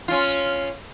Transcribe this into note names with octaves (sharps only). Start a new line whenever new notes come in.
C#4 F4